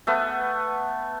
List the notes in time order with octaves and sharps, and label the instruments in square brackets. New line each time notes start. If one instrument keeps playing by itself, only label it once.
[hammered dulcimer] A3 B3